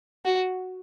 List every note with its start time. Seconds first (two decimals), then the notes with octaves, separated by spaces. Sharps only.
0.25 F#4